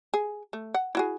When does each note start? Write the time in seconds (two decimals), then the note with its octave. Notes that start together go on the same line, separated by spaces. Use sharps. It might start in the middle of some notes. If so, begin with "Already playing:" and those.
0.14 G#4
0.53 A3
0.74 F#5
0.95 E4 F#4 G#4